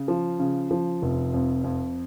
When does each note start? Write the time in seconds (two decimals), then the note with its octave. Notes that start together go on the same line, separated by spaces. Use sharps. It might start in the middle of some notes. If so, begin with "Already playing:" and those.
Already playing: C#3
0.08 F3
0.39 C#3
0.71 F3
1.02 F1
1.34 F2
1.64 F2